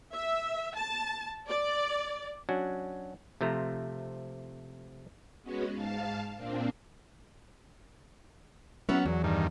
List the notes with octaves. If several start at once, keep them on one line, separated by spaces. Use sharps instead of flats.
E5
A5
D5
F#3 C#4 D4 F#4
C3 F3 A3 C5 A#5
G#3 B3 C#4 F#4
G#2 F5 A5
A#2 A#3 C4 D4
F#3 B3 C#4 E4 F#4
E2 F#3
G2 D#3